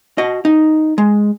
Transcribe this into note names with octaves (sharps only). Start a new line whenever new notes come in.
F#4 D#5
D#4
G#3